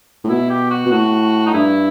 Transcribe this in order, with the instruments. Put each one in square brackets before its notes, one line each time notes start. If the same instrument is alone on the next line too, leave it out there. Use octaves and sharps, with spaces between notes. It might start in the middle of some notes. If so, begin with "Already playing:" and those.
[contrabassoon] A2
[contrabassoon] B2 [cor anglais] E4
[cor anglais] G4
F#4
[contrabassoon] B2
[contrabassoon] A2 [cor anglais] F#4
[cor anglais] D#4
[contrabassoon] G2 [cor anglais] E4